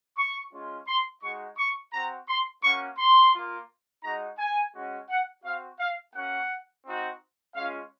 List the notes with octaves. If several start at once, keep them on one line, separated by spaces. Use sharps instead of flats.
C#6
G#3 C#4 F4
C6
G#3 D#4 F#4 C#6
C#6
C4 F#4 A#5
C6
A#3 C#4 F#4 C#6
C6
A#3 F4
G#3 D#4 F#4 A#5
G#5
G#3 C#4 F#4
F#5
C4 F#4 F5
F5
A#3 C#4 F#4 F#5
C4 D#4 F#4
G#3 C#4 F4 F5